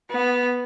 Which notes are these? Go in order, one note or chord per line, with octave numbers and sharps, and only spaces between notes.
B3